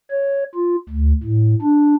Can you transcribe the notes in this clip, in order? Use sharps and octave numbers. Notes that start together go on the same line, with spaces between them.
C#5
F4
D2
A2
D4